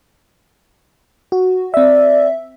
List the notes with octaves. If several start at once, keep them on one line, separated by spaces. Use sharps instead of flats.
F#4
C4 D5 E5